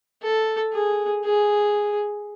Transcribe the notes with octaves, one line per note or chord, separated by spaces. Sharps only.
A4
G#4
G#4